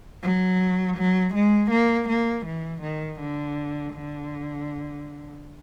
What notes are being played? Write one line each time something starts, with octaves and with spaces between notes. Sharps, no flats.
F#3
F#3
G#3
A#3
A#3
E3
D#3
D3
D3